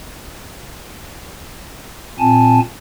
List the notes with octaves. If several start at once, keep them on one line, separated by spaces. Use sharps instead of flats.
A#2 C4 G#5 A5